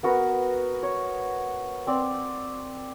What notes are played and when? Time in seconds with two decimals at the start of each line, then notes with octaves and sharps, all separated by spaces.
0.03 B3 F#4 A#4 B4
0.83 C#5
1.87 C4 D5